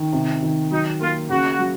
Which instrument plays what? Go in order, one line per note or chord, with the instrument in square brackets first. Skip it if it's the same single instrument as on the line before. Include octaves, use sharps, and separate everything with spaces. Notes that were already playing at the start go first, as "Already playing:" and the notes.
Already playing: [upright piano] D#3
C3
D#3
[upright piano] F#3 [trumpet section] D#4
[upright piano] A#3 [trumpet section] F4
[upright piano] C#3 [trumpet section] F#4
[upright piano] F#3